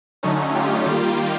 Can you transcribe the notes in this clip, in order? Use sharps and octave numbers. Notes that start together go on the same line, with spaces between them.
D3 F#3 A3 C#4 D#4
F4 G4
D#3 G3 A#3